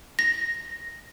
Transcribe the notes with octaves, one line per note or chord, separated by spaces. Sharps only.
A#6